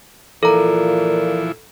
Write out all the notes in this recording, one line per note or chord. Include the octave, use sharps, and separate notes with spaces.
A#2 E3 F3 E4 A4 A#5